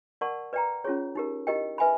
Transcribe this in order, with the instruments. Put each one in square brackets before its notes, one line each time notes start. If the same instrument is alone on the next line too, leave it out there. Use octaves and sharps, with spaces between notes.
[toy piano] A#4 D5 F#5 A5 C#6
B4 D5 G5 A#5
C#4 F4 G#4 C#5
D#4 G4 A#4
E4 G4 A#4 D#5 G5
B4 E5 G#5 B5